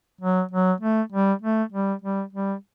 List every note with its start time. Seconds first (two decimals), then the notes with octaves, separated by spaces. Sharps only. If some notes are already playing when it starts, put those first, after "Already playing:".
0.21 F#3
0.51 F#3
0.81 A3
1.12 G3
1.42 A3
1.72 G3
2.02 G3
2.33 G3